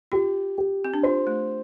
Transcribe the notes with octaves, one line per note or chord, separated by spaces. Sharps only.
F4 G4
G4
C4
D4
F4 C5
A3